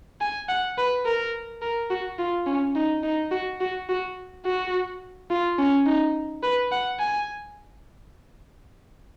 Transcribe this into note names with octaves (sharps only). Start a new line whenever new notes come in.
G#5
F#5
B4
A#4
A#4
F#4
F4
C#4
D#4
D#4
F#4
F#4
F#4
F#4
F4
C#4
D#4
B4
F#5
G#5